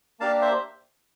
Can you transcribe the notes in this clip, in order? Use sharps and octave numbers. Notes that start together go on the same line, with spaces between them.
A#3 D4 G4 F5 A5
C5 E5